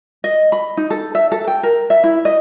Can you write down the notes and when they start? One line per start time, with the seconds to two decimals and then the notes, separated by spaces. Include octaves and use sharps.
0.24 D#5
0.52 B5
0.77 D#4
0.90 A4
1.15 E5
1.32 A4
1.48 G5
1.63 A#4
1.90 E5
2.04 E4
2.25 D#5